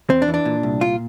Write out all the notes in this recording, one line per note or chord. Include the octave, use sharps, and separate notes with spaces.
E2 C4
D4
E3
D4
A#2
C2
A#2 F4